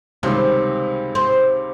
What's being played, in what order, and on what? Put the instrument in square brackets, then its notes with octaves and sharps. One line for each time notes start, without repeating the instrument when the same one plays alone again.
[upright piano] C#2 C3 D#3 G3 C#4 [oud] C4
[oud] C4